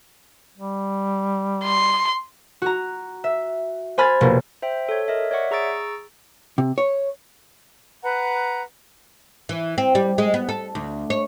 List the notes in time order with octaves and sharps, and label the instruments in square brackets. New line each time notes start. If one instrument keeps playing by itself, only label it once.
[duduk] G3
[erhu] C6
[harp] F#4 A#5
E5
C5 G#5 B5 F6 G#6 A6
F1 B2 A#3
[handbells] C5 E5 G5
A4 C#5
A#4 D#5 E5
C#5 D5 E5 F#5 C#6
G#4 A#5 C#6 E6 A6 D7
[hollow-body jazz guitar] C3
C#5
[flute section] B4 F#5 A#5
[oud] E3
C4
G3
G#3
B3
A4
D2
C#5